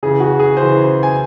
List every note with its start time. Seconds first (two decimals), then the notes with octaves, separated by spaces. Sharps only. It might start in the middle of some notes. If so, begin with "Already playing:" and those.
0.03 C#3 E3 G#4
0.20 F#4
0.39 G#4
0.57 C#3 E3 C5
1.03 G#5